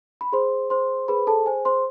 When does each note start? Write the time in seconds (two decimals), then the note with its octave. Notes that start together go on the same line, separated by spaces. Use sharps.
0.21 B5
0.32 G#4 C5 C6
0.70 C5 C6
1.08 G#4 B4 B5
1.27 A4 A5
1.46 C5 G#5
1.65 C5 C6